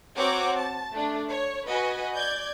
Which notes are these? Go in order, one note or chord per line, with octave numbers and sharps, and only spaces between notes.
C4 F#4 C#5 F#5 A#5 D6
A5
A3 D4
C#5
F#4 B4 D#5 G#5
D5 G6 G#6